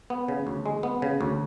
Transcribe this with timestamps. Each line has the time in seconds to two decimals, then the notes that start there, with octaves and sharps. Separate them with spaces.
0.10 B3
0.29 C#3
0.47 D2
0.66 G#3
0.83 B3
1.02 C#3
1.21 D2